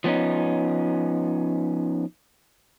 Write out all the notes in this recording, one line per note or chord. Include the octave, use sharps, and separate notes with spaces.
F3 B3 C#4 D#4